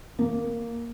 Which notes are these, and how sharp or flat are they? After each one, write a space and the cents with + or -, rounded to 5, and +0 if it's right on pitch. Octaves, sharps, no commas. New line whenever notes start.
A#3 +0